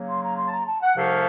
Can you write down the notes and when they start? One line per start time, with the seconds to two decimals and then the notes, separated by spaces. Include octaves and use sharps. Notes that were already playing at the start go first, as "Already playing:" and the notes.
Already playing: C#3 F#3 A#3
0.09 C6
0.24 A#5
0.38 C6
0.46 A5
0.53 A#5
0.67 A5
0.82 F#5
0.96 C2 C3 F3 A3 C#4 F5